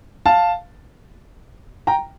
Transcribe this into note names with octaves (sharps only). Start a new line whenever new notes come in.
F5 A5
G5 A#5